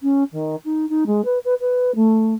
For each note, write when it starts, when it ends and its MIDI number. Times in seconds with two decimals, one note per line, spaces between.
0.01 0.23 61
0.32 0.55 51
0.64 0.88 63
0.89 1.03 63
1.06 1.24 56
1.24 1.38 71
1.44 1.54 71
1.60 1.94 71
1.95 2.34 57